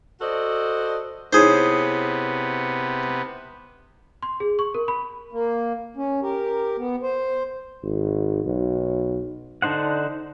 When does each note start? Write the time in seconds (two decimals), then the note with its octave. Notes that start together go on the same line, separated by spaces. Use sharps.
0.21 F#4 A4 C5 D5 D#5
1.33 C3 B3 D#4 E4 G#4 C5 C#5
4.23 C6
4.40 G#4
4.59 C#6
4.74 A#4
4.88 B5
5.33 A#3
5.97 C#4
6.22 G4 A#4
6.78 B3
7.03 C5
7.83 G#1
8.45 B1
9.62 D3 D4 D#4 C5 F#5